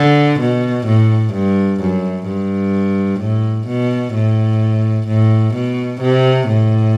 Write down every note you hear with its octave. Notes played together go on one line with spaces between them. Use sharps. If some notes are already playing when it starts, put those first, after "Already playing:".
Already playing: D3
B2
A2
G2
F#2
G2
A2
B2
A2
A2
B2
C3
A2